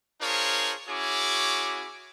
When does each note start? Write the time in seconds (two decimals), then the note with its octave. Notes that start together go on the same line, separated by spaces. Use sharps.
0.22 D4 F4 G#4 A#4 C5 C#5
0.89 C#4 E4 F#4 G#4 C#5 D6